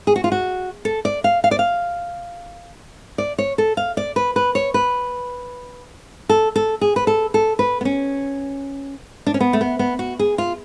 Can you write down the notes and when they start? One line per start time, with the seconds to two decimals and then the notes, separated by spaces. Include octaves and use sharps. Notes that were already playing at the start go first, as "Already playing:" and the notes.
0.07 G#4
0.16 F#4
0.24 F4
0.32 F#4
0.85 A4
1.05 D5
1.24 F5
1.44 F5
1.51 D5
1.59 F5
3.18 D5
3.38 C#5
3.58 A4
3.77 F5
3.97 D5
4.16 B4
4.36 B4
4.55 C#5
4.74 B4
6.29 A4
6.56 A4
6.81 G#4
6.96 B4
7.07 A4
7.34 A4
7.59 B4
7.81 B3
7.85 C#4
9.27 D4
9.34 C#4
9.40 B3
9.53 A3
9.61 B3
9.79 B3
9.99 F#4
10.19 G#4
10.38 F4